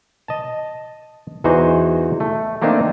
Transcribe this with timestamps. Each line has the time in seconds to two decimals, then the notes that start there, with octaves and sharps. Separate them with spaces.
0.28 D#5 A5
1.44 E2 E3 D#4 F#4 C5
2.20 A3
2.62 A3 A#3 C4 D4 D#4